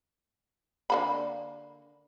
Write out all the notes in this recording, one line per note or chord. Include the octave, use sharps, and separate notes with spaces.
D3 A#3 B5